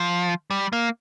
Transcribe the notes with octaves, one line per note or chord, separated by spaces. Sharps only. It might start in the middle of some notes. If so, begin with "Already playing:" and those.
Already playing: F3
G3
A#3